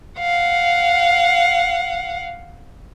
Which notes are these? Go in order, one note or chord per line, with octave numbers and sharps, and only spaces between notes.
F5 F#5